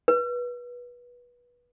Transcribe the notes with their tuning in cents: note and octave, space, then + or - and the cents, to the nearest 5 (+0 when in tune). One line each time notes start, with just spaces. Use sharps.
B4 -20